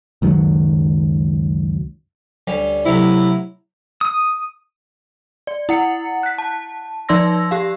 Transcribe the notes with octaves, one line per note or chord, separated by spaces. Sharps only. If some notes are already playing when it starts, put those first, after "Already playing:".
C#2 F#2 D#3 F#3
D2 G3 C#4
C3 F#3 A3 E4
D#6
D5
E4 F#5 C#7
F#6 B6
A5
F3 D#4 D5 C6 E6 A#6
G4 F5